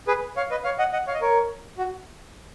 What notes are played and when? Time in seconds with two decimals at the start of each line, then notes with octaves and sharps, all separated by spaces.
0.08 G#4 B4
0.37 C#5 F5
0.51 B4 D#5
0.64 C#5 F5
0.79 D#5 F#5
0.93 D#5 F#5
1.07 C#5 F5
1.14 D#5
1.21 A#4 C#5
1.78 F#4